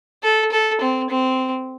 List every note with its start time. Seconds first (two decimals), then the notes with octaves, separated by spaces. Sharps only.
0.23 A4
0.52 A4
0.81 C4
1.10 C4